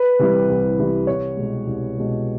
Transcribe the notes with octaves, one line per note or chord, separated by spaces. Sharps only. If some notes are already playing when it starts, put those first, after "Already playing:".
Already playing: B4
C3 E3 G3
C2
C3 E3 G3
C2 C#5
B2 G#3
C2
B2 G#3